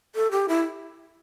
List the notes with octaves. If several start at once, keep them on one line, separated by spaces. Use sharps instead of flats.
A4
G4
E4